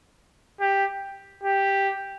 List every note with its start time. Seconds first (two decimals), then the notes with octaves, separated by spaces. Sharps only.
0.60 G4
1.43 G4